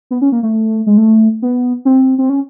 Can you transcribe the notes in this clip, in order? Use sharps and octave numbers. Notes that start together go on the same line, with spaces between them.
B3
C#4
A#3
A3
G#3
A3
B3
C4
C4
C#4